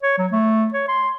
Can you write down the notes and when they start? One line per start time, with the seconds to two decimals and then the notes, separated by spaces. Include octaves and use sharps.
0.03 C#5
0.18 F#3
0.32 A3
0.74 C#5
0.88 C6